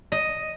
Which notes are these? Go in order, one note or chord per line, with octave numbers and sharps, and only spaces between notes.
D#5